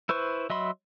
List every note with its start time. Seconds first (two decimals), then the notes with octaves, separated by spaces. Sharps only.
0.09 E4 B4 C5 C#6
0.50 F#3 D#5 E5 B5 C6